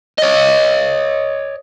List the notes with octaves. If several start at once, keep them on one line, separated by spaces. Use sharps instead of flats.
C#5 D#5